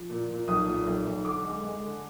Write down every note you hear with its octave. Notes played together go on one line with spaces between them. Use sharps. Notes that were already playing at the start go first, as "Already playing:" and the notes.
Already playing: F3
A#2
A#2
B1 D#6
A#2
B1
B1
D3 D6
G#3
G#3
D3